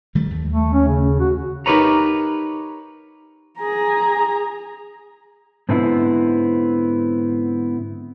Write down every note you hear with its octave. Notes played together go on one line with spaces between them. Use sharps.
D#3 G3 A3
D#2
A3
C#4
C#3
F#4
D#4 G4 A#4 B4 C#5 A#5
G#4 A#5
G#2 D3 B3 C4 E4